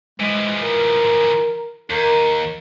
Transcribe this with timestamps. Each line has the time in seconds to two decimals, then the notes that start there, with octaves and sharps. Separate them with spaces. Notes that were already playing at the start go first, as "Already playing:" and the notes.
0.20 E3 F3 G#3
0.61 A#4
1.90 D#2 A#4